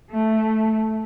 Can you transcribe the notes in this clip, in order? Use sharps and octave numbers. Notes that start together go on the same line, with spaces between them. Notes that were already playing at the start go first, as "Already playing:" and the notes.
A3